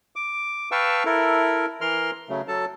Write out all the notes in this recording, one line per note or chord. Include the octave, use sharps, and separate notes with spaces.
D6
B4 F5 G5 A5 C#6 E6
E4 A4 A#4
E3 A#4 C6 F6
C#3 F#3 A3
F#3 A4 A5